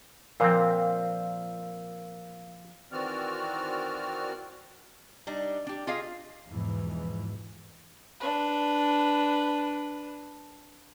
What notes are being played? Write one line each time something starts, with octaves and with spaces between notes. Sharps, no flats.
A#2 F3 C4 A#4 C5 F5 E6
D#3 E3 C4 F#4 D5 F6
G3 D4 D#4
D4 G4
F4 G4 G#4 D#5 F5
E2 G#2 B2 E3 F3
D4 B4